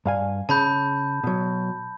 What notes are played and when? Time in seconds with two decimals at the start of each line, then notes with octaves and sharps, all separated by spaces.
0.06 G2 F5 G#5
0.49 C#3 A5 B5 G6
1.24 B2 F#3